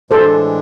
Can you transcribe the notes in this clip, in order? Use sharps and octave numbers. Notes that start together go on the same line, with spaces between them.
A2 E3 G#3 D4 A4 C5